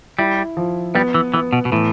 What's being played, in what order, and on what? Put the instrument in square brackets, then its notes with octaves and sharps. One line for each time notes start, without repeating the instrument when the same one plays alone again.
[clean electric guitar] G3 [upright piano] E4
[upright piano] F3
[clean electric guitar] G3 [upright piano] B3
[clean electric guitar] E3
[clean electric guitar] E3 [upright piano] B3
[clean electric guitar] B2
B2
[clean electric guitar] A2 [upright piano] E3